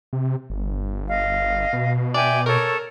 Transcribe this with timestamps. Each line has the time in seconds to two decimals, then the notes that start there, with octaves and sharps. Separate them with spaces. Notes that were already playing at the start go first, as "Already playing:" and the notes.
0.13 C3
0.50 G1
1.08 D#5 F5
1.73 B2
2.14 D5 E5 G5 G#5
2.46 A4 A#4 C#5 C#6